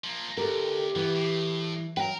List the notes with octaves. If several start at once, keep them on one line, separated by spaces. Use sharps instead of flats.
F3 A#3
D2 G4 A4 A#4
E3 F3 B3
A2
F#2 F#3 A#4 B4 G5